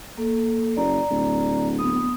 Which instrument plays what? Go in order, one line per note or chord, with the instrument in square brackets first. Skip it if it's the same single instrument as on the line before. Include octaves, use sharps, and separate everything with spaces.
[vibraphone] A#3 A4
[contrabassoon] F#1 [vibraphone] D5 A#5
[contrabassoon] D1
[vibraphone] B3 D#6